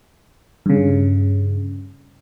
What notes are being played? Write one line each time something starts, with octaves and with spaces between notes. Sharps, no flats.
G2 C#3